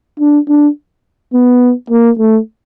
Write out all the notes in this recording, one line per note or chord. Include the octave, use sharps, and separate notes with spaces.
D4
D4
B3
A#3
A3